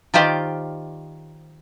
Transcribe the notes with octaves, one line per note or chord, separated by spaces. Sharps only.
D#3 F4 G4 C5 D5